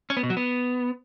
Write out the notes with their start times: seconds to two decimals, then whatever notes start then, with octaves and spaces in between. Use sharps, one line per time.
0.10 C#4
0.17 B3
0.23 B2
0.30 F#3
0.37 B3